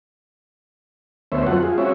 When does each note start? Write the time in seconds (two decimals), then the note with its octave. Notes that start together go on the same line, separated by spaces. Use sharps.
1.32 D2 A3 B3 C5 C#5 E5
1.47 F2 F#3 C4 F4 A4 F#5
1.63 F4 G#4
1.78 G#3 C4 C#4 F#4 C#5 E5